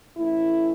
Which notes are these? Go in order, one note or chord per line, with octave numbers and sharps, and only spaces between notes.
A2 E3 A3 C#4 E4